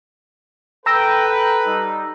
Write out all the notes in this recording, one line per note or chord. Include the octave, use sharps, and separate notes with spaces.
A4 B4 G5 A#5 E6 A#6
G5
G3 D#4